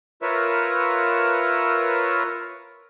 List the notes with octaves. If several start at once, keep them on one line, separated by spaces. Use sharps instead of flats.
F4 A#4 B4 C#5 E5